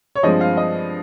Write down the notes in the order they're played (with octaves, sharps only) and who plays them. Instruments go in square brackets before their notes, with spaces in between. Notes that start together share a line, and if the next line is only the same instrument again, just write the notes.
[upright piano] C#5
G2 F3 G#3 C4 D#5
F5
D#5